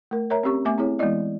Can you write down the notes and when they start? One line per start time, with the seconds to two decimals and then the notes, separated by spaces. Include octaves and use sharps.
0.11 A3 A#4
0.30 A#4 C#5 E5 A#5
0.43 C4 C#4 G4 C#6
0.65 A3 B3 E5 G#5 D6
0.78 C4 E4 G#4 C#5
0.99 E3 G#3 B3 E4 D5 D#5